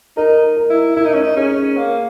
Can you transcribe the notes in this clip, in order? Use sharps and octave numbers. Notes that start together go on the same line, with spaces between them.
D#4 A#4
A#4
E4
E4 A#4
D#4
C#4
D#4
C#4 G#4
A#3